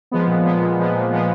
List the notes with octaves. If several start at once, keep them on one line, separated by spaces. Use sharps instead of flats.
F3 G#3 B3
A#2
F3 G#3 B3
A#2
F3 G#3 B3
A#2
F3 G#3 B3